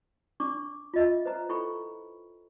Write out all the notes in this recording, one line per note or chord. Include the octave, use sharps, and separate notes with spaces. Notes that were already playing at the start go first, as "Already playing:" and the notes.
D4 C#6 D6
F4 D#5 E5
B4 C5 A#5
E4 A4 G5 B5 C#6